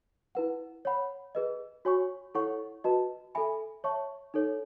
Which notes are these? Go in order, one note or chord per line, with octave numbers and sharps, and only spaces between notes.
E4 B4 F#5
C#5 F#5 B5
G#4 B4 D#5
F#4 C#5 G#5 C#6
E4 A4 C#5 F#5 C#6
F#4 B4 D#5 A5
A4 E5 G#5 B5
C#5 E5 A5 C#6
D#4 A4 C#5